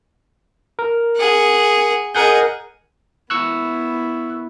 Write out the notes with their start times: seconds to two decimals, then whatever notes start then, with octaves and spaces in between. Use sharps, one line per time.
0.79 A#4
1.17 G#4 F#5
2.15 G#4 A#4 D#5 F#5 G6
3.30 B3 E4 C#6 E6 F#6